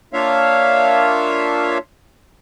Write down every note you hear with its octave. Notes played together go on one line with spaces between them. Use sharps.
A#3 D4 F4 C#5 E5 F5